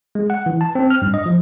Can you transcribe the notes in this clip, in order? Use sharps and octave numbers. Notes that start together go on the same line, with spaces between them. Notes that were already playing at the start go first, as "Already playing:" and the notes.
G#3
F#5
E3
A5
C4
F6
G2
D#5
F3